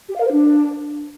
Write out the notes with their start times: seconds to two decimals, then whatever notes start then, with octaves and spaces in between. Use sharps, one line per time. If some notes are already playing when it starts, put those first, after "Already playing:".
0.09 G4
0.15 F5
0.21 A#4
0.27 C5
0.32 D4